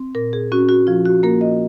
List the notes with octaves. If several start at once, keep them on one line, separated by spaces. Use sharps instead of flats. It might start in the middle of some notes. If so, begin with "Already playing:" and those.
Already playing: C4
A#2 A#4
G#4
C#4 F#4
F#4
F3 F4
F#4
A#3 A#4
D#5